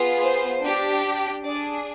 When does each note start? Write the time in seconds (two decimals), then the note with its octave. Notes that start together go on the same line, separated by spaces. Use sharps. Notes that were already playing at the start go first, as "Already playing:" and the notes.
Already playing: B3 F4 G#4
0.22 C5
0.62 D4 G4
1.44 D4 G#4 D5